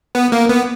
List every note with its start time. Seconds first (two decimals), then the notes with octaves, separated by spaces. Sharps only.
0.15 B3
0.32 A#3
0.49 B3